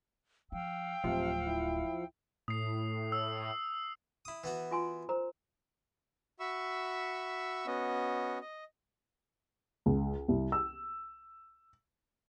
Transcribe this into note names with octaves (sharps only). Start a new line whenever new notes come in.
F3 F5 G5 E6
D1 C3 F3
E4
A2 D#6 C7
E6
E4 D#6
E3 B3 F#4
F4 G#5 C6
A#4 C5 A#5
F#4 E5 B5 C#6 E6
B3 C#4 F#4 D#5
D#5
C#2
C2
E6